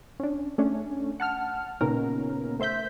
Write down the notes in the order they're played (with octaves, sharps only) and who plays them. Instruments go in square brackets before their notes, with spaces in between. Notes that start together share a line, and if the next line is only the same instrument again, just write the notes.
[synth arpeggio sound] C#4 D4
A3 C#4 D4
F#5 A5 F6
A#2 C#3 B3 C#4 D#4 A#4
A3 C5 E5 G6 B6